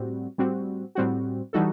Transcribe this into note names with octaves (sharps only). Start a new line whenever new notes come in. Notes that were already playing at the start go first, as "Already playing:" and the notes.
Already playing: A2 G3 C4 F#4
A2 G3 C4 F#4
A2 G3 C4 F#4
E3 G3 D#4 F#4 A4